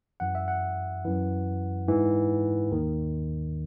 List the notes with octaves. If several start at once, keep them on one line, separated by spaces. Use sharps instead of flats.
F#2 E3 F#5
E5
F#5
F#2 E3
G#2 E3
D#2 D#3